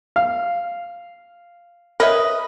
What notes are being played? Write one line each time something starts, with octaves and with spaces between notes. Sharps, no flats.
F5
A#4 B4 C#5 D#5 E5 D#6